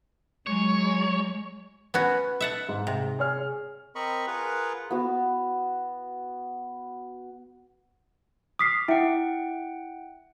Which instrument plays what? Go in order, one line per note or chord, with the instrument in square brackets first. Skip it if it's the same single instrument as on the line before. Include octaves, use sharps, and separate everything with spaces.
[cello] F#3 G#3 [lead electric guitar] C#5
[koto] B3 C#4 F#4 [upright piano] B4
[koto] E5 F#5 A5
[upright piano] G#2
[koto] C3
[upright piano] G#4 C#5 F6
[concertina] C4 A#4 D#5 B5 C#6
F4 G#4 A#4 B4 F#5
[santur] B3 F#4
[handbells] D6 F6 [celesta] D#6 B6 C7
[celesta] E4 E5 [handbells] F#5 G5